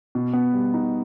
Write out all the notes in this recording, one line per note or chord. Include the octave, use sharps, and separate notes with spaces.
B2
B3
G3
D#4